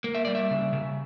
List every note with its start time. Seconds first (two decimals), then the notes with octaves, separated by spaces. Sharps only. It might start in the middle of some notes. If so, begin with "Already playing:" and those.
0.04 A#3
0.15 E5
0.25 G3 D5
0.35 E5
0.50 C#3
0.73 C#3